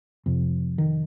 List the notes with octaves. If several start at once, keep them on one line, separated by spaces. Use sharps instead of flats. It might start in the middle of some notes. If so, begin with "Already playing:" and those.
F2 C3
D#3